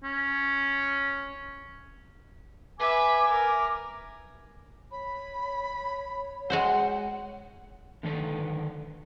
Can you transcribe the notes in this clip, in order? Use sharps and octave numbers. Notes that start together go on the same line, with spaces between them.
C#4
B4 E5 G#5 D6
A#4
C#5 B5
G#3 F#4 C5 F#5
D3 D#3 A4 B4